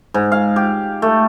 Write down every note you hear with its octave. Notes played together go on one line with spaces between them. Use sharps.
G#2
F5
G4
A3